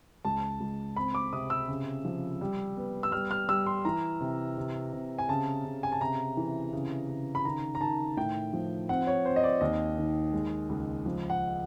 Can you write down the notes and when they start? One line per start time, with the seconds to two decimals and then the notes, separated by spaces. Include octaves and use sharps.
0.24 C#2 A5
0.60 C#2
0.96 C4 B5
1.15 D6
1.33 C3 D#6
1.50 E6
1.68 C#3
2.05 F3
2.41 G3
2.77 B3
3.03 E6
3.12 G3 F6
3.31 F6
3.49 G3 E6
3.66 C6
3.85 E3 A#5
4.20 C3
4.57 C3
4.93 C3
5.18 G#5
5.29 C#3 A5
5.65 C#3
5.83 G#5
5.92 A5
6.01 C3 A#5
6.37 E3
6.73 C#3
7.09 C#3
7.35 B5
7.44 D#3 A#5
7.75 A#5
7.81 D#3 A5
8.17 A2 G5
8.53 F3
8.89 C4 F#5
9.07 C#5
9.25 C4 C5
9.36 D#5
9.43 D5
9.61 D#2 D#5
9.97 D#3
10.33 G#3
10.69 C#2
11.06 F3
11.30 F#5